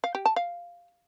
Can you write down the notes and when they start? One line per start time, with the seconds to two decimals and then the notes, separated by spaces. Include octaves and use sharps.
0.04 F5
0.15 G4
0.26 A5
0.36 F5